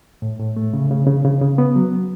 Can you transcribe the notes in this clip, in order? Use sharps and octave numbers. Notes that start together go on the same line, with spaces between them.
A2
A2
A3
C#3
C#3
C#3
C#3
C#3
B3
F#3